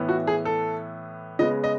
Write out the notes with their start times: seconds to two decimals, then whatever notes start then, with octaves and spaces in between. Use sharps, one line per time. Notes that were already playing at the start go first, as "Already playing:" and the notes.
Already playing: A2 E3 B3
0.09 F#4
0.27 G#4
0.45 A4
1.39 C#3 G#3 B3 D#5
1.64 D#5